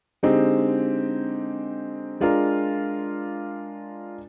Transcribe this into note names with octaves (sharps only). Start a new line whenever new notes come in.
D3 G#3 C4 D#4 G4
G#3 D4 F4 A#4